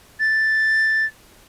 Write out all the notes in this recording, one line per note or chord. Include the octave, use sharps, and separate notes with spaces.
A6